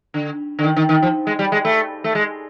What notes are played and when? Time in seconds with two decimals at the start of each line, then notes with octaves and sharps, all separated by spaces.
0.14 D3
0.59 D3
0.64 D#3
0.76 D#3
0.89 D#3
1.02 F3
1.27 G#3
1.39 G3
1.52 G#3
1.65 A3
2.04 A3
2.15 G#3